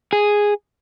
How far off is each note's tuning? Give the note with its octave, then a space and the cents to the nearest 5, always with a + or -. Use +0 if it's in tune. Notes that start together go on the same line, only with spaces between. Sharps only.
G#4 -5